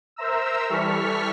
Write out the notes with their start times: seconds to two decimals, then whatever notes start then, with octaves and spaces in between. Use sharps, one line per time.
0.16 A#4 C5 E5 A#5 E6
0.68 E3 G3 A4 C#6 F6 B6